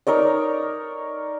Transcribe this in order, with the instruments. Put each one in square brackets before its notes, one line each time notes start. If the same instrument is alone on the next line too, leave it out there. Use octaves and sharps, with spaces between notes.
[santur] D#4 A#4 C#5 D5